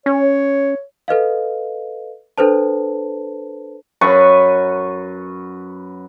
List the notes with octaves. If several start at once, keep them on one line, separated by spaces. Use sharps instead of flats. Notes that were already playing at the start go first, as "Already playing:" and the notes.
C#4 C#5
A4 B4 D#5 F5
D4 A4 B4 C5 A5
F#2 B4 C#6